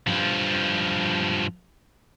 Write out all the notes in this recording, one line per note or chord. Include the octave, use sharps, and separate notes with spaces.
G2 F3